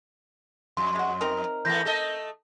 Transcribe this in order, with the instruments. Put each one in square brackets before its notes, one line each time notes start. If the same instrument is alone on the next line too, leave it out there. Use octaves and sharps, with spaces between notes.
[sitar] F2 [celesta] C6
[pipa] G#3 F#4
C4 D#4 A#4
[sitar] E3 A3 B3 [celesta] G6 A#6
[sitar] A3 A4 D#5